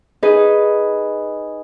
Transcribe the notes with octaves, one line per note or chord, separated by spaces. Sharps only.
D#4 G#4 B4